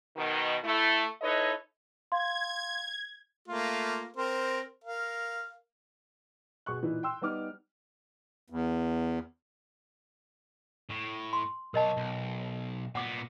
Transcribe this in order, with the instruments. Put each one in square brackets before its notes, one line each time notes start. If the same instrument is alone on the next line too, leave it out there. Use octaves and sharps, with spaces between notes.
[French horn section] B2 D#3
A3 E4
D#4 E4 A4 B4 C#5 D#5
[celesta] F5 C6 [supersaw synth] G#6
[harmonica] A3 A#3 F4
C4 A#4 C5
A#4 F5
[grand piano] B2 G#4 C#6 F#6
A#2 E3 D#4 E4
G5 C6 E6
G3 B3 D#4 D6 F6
[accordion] E2
[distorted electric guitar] A2
[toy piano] C6
[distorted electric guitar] B1 C#5 [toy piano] A#4 D#5 A5
[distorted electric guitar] B1
[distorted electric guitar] A#2 B3 [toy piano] F#5 D6